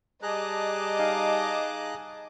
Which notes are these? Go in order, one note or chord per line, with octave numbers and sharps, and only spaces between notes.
G3 G#4 D#5 A5 A#5 D6 F#6
D#4 F5 G#5